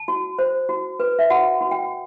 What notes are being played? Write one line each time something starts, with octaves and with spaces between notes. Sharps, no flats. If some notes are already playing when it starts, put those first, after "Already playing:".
Already playing: A5
F#4
C5
F#4
B4
E5
F#4 F#5
F#4
G5